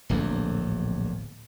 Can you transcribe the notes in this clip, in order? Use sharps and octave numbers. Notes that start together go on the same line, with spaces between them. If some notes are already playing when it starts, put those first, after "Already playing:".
D1 A#1 E2